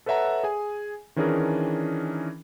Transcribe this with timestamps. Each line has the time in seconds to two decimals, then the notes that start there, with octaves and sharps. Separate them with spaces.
0.06 A4 B4 C#5 E5 F#5 A#5
0.44 G#4 G#5
1.16 D#3 E3 C#4 D4 G#4 A#4